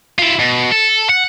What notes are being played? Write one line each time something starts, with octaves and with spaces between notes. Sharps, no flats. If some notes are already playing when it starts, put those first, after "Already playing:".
E4 F4
B2
A4
F#5